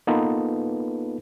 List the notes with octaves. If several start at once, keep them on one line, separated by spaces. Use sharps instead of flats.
A#3 B3 D#4 F4 A4 B4